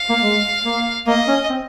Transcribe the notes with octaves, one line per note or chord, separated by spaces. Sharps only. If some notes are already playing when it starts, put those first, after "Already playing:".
Already playing: F5
A#3
G#3
A#3
A#3 D#5
C#4
C4